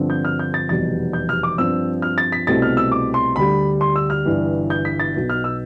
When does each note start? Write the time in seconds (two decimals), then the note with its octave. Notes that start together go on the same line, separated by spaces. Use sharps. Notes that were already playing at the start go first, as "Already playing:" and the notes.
Already playing: G2 D3 F3 C4
0.10 G6
0.25 F6
0.39 G6
0.54 A6
0.69 F1 E2 B2 G3 B3 A6
1.13 G6
1.29 F6
1.43 D6
1.58 G2 F3 C4 E6
2.02 F6
2.18 A6
2.32 B6
2.47 C2 B2 A3 C4 A6
2.62 F6
2.77 E6
2.92 D6
3.14 C6
3.36 D2 D3 G3 B5
3.81 C6
3.96 E6
4.10 F6
4.25 G1 G2 E3
4.70 G6
4.85 B6
5.00 A6
5.14 B1 B2 B3
5.30 F6
5.44 E6